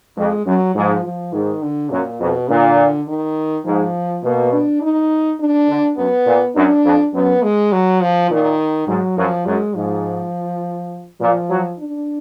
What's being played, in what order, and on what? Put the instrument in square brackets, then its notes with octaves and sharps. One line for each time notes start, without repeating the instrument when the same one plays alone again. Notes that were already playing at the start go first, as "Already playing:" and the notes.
[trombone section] F2 [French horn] G#3
[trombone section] F#2 [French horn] F#3
[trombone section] G#2 [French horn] F3
[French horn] F3
[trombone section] G#2 [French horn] D#3
[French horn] D3
[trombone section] F#2 [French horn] A#2
[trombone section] F2 [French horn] B2
[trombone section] A#2 [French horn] D3
[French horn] D#3
[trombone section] G#2 [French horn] F3
[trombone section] B2 [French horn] A#3
[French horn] D4
D#4
D4
[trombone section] D3
[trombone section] F#2 [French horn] B3
[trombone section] A#2
[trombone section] F#2 [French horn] D4
[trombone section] F2
[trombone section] F#2 [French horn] B3
[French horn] G#3
F#3
F3
[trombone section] A#2 [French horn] D#3
[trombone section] G#2 [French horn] F#3
[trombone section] F#2 [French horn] F3
[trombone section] F#2 [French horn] G#3
[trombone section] G#2 [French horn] F3
[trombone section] A#2 [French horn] F3
[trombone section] F#3
[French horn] D4